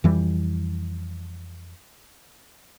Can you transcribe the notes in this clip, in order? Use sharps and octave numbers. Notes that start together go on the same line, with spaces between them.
F2 E3 G3